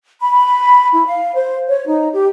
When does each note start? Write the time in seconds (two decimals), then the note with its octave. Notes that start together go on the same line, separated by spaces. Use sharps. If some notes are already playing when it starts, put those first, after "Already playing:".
0.21 B5
0.93 E4
1.06 F5
1.35 C5
1.68 C#5
1.86 D#4
2.13 G4